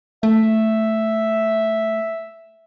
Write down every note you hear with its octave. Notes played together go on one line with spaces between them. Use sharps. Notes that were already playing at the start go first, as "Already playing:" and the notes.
A3 E5